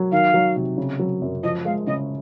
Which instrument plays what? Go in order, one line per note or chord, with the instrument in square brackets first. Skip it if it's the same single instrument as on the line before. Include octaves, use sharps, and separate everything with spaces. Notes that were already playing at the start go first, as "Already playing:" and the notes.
Already playing: [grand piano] F#3
[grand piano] D#3 [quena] F5
[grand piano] F#3
C3
C#3
F#3
F#2
[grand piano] F3 [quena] D#5
[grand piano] G#3 [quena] F5
[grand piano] C#3 [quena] D#5